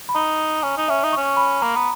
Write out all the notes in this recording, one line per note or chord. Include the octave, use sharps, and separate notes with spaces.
B5
D#4 A#5
C#4 G#5
D#4
C#4 E5
D#4
C#4 C#6
B5
A#3 A#5
B3